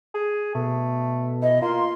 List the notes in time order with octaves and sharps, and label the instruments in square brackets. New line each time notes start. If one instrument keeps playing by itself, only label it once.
[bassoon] G#4
[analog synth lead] B2 [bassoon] A3
[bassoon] E3 [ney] D#5
[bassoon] A#3 [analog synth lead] F4 [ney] C6